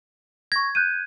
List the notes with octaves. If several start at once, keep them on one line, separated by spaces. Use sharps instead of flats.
C#6 G#6 A#6
F#6 G6 D#7